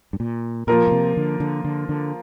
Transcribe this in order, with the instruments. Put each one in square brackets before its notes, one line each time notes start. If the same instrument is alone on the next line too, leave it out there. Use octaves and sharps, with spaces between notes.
[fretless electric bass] G2
A#2
[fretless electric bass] A#2 [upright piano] F3 A#3 F4 A#4
[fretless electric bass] A#2
C3
D3
D3
D3
D3